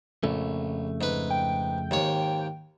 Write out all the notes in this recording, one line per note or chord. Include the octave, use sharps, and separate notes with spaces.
A#1 F2 C#3 A3
G#2 B4
G5
D#2 G#2 C#5